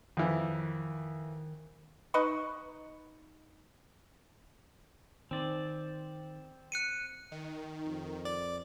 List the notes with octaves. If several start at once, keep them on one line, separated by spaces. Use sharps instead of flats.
F2 D#3 E3
D#4 B4 D#5 C#6
D#3 C4 D5
F#6 C#7 D#7
D#3
F2
D5